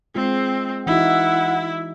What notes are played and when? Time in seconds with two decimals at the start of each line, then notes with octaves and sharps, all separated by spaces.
0.15 G#3 C4 F4
0.87 E3 D#4 E4 F#4 F#5